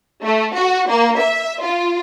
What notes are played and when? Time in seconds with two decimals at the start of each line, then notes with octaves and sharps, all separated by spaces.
0.23 A3
0.54 F#4
0.89 A#3
1.20 E5
1.62 F4